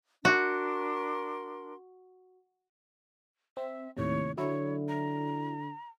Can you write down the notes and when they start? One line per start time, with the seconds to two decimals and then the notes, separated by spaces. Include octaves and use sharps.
0.25 D4 F#4 A#4 C6
3.57 C4 E5
3.97 D#2 A2 C3 C#5
4.38 D3 F#3 E4 C#5
4.88 A#5